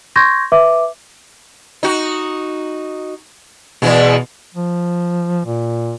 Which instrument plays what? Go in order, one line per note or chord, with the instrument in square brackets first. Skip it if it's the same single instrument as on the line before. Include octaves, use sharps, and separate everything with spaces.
[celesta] C6 C#6 G6 G#6 A#6
B4 E5 D6
[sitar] D#4 F#4
[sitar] E2 E3 G#3 [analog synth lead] B2
[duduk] F3
A#2